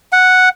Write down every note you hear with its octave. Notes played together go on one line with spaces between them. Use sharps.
F#5